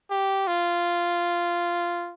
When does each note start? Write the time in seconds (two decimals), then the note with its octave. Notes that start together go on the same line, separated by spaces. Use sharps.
0.11 G4
0.47 F4